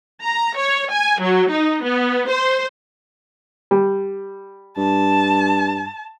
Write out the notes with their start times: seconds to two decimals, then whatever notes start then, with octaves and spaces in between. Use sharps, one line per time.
0.21 A#5
0.57 C#5
0.91 G#5
1.21 F#3
1.50 D#4
1.84 B3
2.28 C5
3.71 G3
4.78 G2 A5